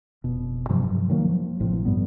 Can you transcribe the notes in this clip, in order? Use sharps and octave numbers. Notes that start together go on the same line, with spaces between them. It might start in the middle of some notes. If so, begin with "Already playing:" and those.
F1 B2
G2 C3 F3 F#3
D#3 F#3 A#3
F3
A1 A2 C3 F3
G2 G3 B3